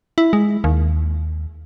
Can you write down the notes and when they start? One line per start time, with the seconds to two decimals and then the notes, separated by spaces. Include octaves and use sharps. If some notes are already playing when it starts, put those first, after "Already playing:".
0.18 E4
0.33 G#3
0.64 D#2